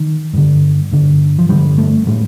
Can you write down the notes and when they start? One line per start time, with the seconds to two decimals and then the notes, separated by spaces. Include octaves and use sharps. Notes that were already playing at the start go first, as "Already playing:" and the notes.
Already playing: D#3
0.33 G2 D3
0.92 G2 D3
1.39 F3
1.49 G2 D3 G3
1.78 A3
2.07 A2 G3